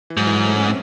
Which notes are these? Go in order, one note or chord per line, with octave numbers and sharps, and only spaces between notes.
E3
G#2 F#3
E3
F#3
A3
C#4
C4